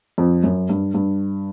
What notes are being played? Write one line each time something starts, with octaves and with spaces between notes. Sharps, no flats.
F2
F#2
G2
G2